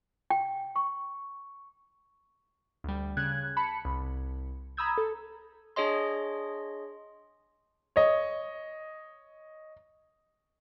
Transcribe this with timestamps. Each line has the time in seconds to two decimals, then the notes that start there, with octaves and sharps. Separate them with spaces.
0.30 G5
0.76 C#6
2.84 D2 G3
3.17 C#3 F#6 G#6
3.57 A5 B5 C#7
3.85 C2
4.77 A#5 B5 D#6 E6 G6 G#6
4.98 A4
5.76 D4 G#4 C#5 D#5 C6
7.96 C#5 D#5